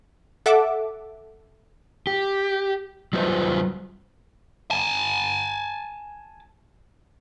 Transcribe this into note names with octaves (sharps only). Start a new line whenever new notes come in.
A4 E5 F#5 D6
G4
F#3 G3 F4 B4 C5 D#5
G#5 A5